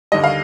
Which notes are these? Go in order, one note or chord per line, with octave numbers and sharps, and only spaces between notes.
D#2 D3 G3 D#5
F5